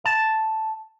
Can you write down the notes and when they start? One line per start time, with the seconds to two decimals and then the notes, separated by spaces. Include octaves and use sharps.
0.05 A5